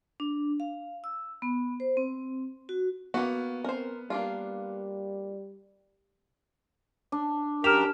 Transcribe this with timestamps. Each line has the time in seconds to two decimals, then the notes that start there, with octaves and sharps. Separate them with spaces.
0.20 D4
0.60 F5
1.04 E6
1.42 B3
1.80 C5
1.97 C4
2.69 F#4
3.14 A#3 B3 F#4
3.64 C4 A#4 C5
4.10 G3 A#3 D4 F4
7.12 D4
7.64 F#2 G4 A#4 F6 E7 F7